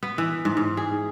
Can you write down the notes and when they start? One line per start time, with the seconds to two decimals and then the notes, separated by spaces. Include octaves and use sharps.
0.03 B3
0.18 E3
0.45 G#2
0.57 G#2
0.77 G#4